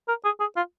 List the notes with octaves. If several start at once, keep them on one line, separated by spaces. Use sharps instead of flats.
A#4
G#4
G#4
F4